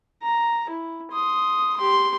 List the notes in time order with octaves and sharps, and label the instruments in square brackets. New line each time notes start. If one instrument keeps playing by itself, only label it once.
[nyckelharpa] A#5
E4
C6 D#6
G4 C6